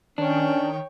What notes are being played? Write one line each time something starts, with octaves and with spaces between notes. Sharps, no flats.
D#3 C#4 D4 C#5 G5